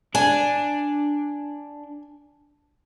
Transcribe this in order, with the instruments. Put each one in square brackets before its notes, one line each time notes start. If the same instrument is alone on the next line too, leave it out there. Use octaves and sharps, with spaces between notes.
[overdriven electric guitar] D4 [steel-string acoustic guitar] G#5